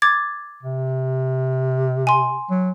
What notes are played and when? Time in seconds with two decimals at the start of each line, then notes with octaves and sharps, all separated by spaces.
0.02 D6 G#6 A6
0.63 C3
2.07 G#5 C6
2.50 F#3